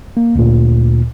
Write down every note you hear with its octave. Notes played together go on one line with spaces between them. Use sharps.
A#3
D2 A#2